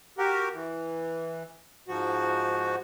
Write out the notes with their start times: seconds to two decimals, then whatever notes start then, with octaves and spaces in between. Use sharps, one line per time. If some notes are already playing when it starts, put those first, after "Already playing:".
0.18 F#4 G4 A#4
0.53 E3
1.88 G#2 F3 F#4